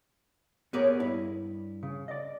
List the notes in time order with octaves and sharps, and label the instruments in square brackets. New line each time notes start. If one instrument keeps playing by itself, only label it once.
[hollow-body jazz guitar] B3 G4 A#4 [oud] G#4 C#5 D5
[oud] G2 [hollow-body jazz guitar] E4
[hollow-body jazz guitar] C#3
D5 D#5